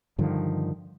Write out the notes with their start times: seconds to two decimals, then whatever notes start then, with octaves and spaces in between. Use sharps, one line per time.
0.18 G2 D3 D#3 F3